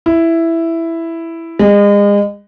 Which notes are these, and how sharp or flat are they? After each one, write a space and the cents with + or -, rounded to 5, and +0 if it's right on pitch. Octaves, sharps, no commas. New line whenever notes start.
E4 +5
G#3 -35